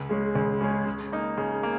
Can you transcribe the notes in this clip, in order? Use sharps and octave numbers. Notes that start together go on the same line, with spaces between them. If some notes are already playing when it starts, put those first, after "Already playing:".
Already playing: C#2
C#3 G#3 C#4
C#2
C#3 G#3 C#4
C#3
A#3 D#4
C#3
A#3